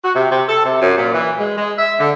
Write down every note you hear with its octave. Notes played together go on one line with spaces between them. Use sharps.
F#4
C3
C3
A4
C3
F#2
A#2
E3
G#3
G#3
E5
D3